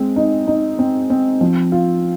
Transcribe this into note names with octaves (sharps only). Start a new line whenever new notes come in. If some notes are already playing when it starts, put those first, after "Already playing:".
Already playing: G#3 C4
D#4
D#4
C4
C4
F3
F4